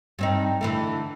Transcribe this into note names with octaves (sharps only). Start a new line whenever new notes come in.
G2 C4 D#4
D3 E3 A3